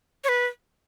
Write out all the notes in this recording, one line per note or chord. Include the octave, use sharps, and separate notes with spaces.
C#5
B4